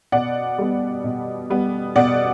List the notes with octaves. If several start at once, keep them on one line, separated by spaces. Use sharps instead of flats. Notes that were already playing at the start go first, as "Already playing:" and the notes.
B2 D5 F#5
G3 B3
B2
G3 B3
B2 D5 F#5